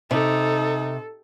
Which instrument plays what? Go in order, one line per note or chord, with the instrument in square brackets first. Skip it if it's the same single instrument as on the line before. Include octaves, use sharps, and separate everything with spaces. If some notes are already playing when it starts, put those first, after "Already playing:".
[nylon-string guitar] C3 [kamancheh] D#4 [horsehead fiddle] A4